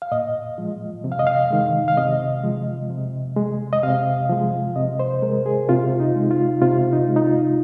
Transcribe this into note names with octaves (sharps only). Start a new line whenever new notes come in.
F5
A#2 D#5
F3 G#3
C3
F5
D#5
F5
D#3 G#3
F5
C3 D#5
F3 G#3
C3
G#3
D#5
C3 F5
F3 G#3
C3 D#5
C5
G#3 A#4
G#4
C3 F4
D#4
G#3
F4
C3 F4
D#4
G#3
D#4
F4